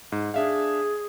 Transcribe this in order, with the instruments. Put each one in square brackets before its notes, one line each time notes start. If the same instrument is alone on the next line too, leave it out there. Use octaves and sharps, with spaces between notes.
[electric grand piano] G#2
[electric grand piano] D4 E5 F5 [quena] G#4